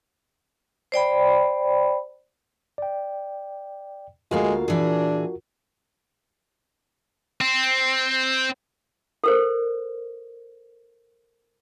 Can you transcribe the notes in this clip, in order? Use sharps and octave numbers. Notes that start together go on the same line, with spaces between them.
C5 D5 G5 B5
D5 G5
D2 G#3 A#3 F4 F#4 A#4 F5
A#2 E3 D4 G#4
C4
A4 A#4 C5